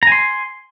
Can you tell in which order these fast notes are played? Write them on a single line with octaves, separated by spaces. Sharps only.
A#5 G#5 C6